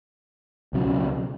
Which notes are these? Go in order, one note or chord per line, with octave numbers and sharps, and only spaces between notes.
C#2 B2 F#3 C#4